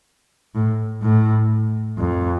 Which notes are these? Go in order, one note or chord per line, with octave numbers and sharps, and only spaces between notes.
A2
A2
F2